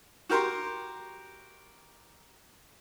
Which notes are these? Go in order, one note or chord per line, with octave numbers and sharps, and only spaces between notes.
F#4 G4 A#4 C6 C#6